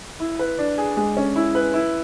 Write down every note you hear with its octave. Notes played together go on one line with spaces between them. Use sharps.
E4
B4
D4
G#4
G#3
C#4
E4
B4
E4